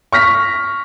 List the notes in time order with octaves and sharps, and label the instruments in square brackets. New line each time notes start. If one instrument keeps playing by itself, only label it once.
[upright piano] C#6 F6 A#6 B6